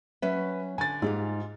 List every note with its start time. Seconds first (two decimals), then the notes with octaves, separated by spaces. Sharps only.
0.22 F#3 C#4 B4 E5
0.78 D3 G#5 A6
1.02 G#2 F4 G4 G#4